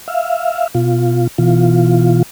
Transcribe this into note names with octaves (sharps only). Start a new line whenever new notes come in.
E5 F5
B2 F4
B2 E3 F4